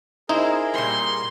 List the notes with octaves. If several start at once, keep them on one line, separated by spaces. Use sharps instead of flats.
D#4 E4 G#4 A#4 C5
A#2 G3 C6